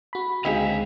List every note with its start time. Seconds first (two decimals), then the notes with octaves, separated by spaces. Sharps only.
0.13 F#4 B5
0.45 C#2 D3 C4 D#4 G#4 D#5 F5 B6